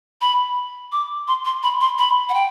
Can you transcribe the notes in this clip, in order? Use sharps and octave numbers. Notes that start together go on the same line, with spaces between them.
B5
D6
C6
C6
B5
C6
B5
F#5
G5